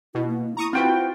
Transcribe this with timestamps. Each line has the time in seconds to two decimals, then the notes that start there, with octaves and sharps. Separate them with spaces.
0.15 B2 E4
0.27 A#3
0.57 E4 A#5 C#6 D#6
0.73 C4 F4 F#4 B4 G5